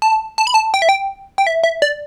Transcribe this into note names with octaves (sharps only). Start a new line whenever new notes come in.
A5
A5
B5
A5
G5
E5
G5
G5
E5
E5
D5